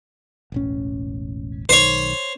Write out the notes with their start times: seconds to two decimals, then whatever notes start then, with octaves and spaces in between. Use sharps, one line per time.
0.52 E1 A1 C#4
1.69 B1 D#3 C5 C#5